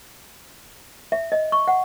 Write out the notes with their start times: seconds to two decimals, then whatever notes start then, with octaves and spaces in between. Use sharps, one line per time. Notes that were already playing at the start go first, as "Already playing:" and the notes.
1.12 E5
1.32 D#5
1.52 C#6
1.68 F#5